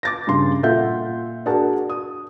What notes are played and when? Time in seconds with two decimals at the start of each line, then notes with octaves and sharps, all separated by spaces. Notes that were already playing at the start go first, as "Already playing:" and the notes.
0.03 D6 A6 A#6
0.27 G2 C#3 C6
0.63 A#2 F4 A4 E5 F#5 G6
1.46 D4 F#4 G#4 A#4 F#5 A5
1.89 D#6